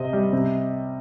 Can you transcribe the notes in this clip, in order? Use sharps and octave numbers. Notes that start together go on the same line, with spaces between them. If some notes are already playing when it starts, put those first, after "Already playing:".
Already playing: C3 C4 D#5
G3
C3